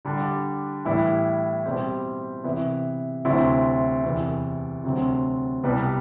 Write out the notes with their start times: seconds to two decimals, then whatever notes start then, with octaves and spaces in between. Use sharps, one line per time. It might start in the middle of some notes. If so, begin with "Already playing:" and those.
0.05 D3 G3 D4
0.85 A2 E3 G3 B3 E4
1.65 B2 G3 C4 G4
2.44 C3 E3 B3 E4
3.25 D2 C3 F#3 C4 E4
4.04 E2 C3 E3
4.83 D2 C3 F#3 C4
5.63 C2 B2 G3 B3